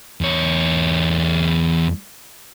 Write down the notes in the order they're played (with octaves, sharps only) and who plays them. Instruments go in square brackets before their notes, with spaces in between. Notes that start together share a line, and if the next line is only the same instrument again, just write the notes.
[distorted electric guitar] E2 C#5